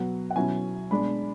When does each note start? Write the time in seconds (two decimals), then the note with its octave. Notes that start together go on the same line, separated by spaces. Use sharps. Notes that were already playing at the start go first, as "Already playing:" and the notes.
Already playing: B2 F#3 B3 F#5
0.31 F#5
0.36 B2 F#3 C#4 E4 G#5
0.91 B2 G#3 D4 B5